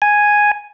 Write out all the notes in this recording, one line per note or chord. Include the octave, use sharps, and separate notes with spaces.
G#5